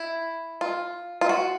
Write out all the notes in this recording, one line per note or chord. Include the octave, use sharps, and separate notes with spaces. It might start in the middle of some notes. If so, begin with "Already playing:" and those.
Already playing: E4
F4
F4
F#4